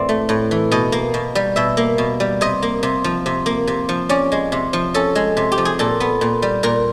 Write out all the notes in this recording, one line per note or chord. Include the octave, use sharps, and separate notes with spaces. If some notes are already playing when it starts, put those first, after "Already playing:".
Already playing: A2 E3 C4 D5
A3
A2
E3
B2 D#5
A#3
B2
G3
B2 E5
A#3
B2
G3
C3 D#5
A#3
C3
F3
C3
A#3
C3
F3
C#4 D5
G#3
C3
F3
C#4 A4
G#3
C3
G4
F3
G#4
A#2 A4
B3
A#2
G3
A#2 A#4